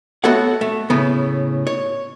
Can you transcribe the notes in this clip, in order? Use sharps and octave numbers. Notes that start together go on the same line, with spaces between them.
A3 B3 F#4 A4 C#5 F#5
A3
A2 C#3 B3
C#5